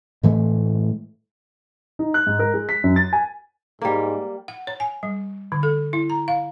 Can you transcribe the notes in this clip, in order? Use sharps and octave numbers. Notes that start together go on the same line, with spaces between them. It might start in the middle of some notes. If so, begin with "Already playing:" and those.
A2 E3 G#3 A3
D#4
F#6
G#2
A#4
G#3
B6
F#2
A6
G#5
G#2 G3 A#3
F#5
C#5
G#5
G3
D3
A4
E4
A#5
F5